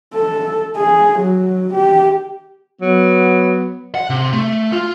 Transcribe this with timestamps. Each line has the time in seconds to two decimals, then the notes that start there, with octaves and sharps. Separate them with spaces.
0.14 A4
0.76 G#4
1.19 F#3
1.73 G4
2.81 F#3 B3
3.95 F#5
4.10 C3
4.33 A3
4.72 F4